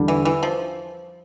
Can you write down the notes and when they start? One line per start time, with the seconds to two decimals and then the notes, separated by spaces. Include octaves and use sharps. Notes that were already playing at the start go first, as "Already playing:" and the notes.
Already playing: E2 D3 G3 D4
0.08 E3
0.25 E3
0.43 F3